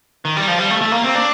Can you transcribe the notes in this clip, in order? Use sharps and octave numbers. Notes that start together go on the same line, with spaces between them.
D#3
G3
F3
G3
A3
A3
A#3
C4
D4